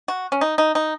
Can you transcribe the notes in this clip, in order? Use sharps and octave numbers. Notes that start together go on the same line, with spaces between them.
F#4
C#4
D#4
D#4
D#4